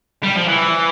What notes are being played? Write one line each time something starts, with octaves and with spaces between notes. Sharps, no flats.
G3
F3
E3